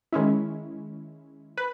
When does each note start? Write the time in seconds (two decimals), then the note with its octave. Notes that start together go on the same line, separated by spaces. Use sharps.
0.12 D#3 G#3 C#4 E4
1.57 B4